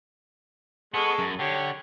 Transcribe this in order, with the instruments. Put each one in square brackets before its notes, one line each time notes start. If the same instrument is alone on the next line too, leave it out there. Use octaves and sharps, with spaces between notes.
[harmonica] G#3 A4 C#6 [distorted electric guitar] B3
[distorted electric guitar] F#2
[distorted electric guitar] D3 [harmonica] G4 C#5